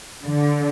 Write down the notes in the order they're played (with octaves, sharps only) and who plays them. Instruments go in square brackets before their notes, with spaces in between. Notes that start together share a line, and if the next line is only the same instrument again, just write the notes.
[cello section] D3